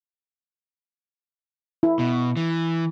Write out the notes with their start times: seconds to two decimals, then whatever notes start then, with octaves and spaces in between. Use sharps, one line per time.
1.83 E4
1.99 B2
2.37 E3